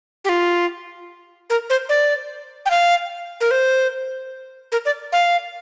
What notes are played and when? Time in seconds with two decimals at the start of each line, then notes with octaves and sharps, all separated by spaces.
0.25 G4
0.29 F4
1.50 A#4
1.70 C5
1.89 D5
2.66 G5
2.70 F5
3.41 A#4
3.51 C5
4.72 A#4
4.85 D5
5.12 F5